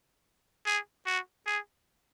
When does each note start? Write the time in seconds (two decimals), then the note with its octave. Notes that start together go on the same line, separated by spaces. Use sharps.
0.66 G#4
1.06 F#4
1.47 G#4